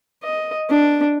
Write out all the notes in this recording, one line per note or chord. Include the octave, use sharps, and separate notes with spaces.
D#5
D4